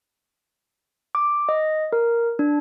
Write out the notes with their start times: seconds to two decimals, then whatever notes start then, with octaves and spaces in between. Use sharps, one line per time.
1.15 D6
1.49 D#5
1.92 A#4
2.39 D4